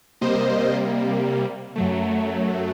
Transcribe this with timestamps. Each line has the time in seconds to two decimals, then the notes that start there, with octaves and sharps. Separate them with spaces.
0.21 C3 G3 A#3 C5 D#5
1.76 F#2 F#3 A3